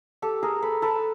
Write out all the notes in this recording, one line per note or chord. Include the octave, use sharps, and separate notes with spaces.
G4 A4
G#4 A#4
A4 B4
A4 B4